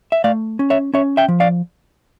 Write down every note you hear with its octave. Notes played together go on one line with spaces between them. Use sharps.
E5
A3 D5 F5
C#4
C#5 E5
C#4 C#5 E5
E5 G5
F3
D5 F5